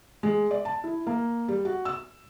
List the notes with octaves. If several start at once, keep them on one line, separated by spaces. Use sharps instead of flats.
G#3
D5
A5
E4
A#3
G3
F#4
E6